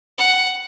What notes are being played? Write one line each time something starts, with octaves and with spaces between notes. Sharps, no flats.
F#5